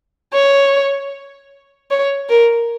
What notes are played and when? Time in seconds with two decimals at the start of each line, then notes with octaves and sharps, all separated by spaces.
0.33 C#5
1.91 C#5
2.29 A#4